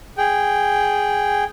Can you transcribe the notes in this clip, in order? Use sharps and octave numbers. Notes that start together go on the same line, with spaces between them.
G#4 G5